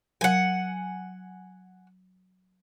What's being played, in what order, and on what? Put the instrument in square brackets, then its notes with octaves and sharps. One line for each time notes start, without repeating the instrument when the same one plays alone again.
[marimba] F#3 A#4 [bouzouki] F#5 G#5